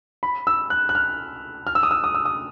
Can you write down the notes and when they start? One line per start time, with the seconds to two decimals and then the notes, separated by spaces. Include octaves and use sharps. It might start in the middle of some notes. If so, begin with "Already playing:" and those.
0.23 B5
0.47 E6
0.70 F#6
0.89 F#6
0.95 F6
1.67 F6
1.75 E6
1.83 D#6
1.91 E6
2.04 D#6
2.15 E6
2.25 D#6